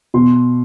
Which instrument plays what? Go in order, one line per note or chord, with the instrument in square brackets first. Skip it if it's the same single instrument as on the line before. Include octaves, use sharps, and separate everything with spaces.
[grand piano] B2 C6